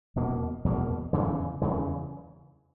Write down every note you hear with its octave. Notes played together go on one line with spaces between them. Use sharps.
E2 B2 A#3
E2 B2 A#3
E2 C#3 E3
E2 C#3 E3